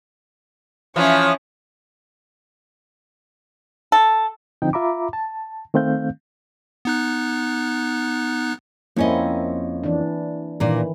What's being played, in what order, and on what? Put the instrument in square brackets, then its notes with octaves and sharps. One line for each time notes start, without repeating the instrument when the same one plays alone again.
[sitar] E3 F3 [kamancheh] C#4 C#5
[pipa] A4
[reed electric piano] D3 F3 C4 D#4 G5
F4 E5 A#5 B5 D6
A5
D#3 A3 C4 F5 G6
[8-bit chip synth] B3 D#4 F#6
[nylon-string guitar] F2 C#4 D#5 [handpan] A#3 C4 E4
[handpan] E3 D4
[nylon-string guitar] A#2 D4 A#4 [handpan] D#3 E3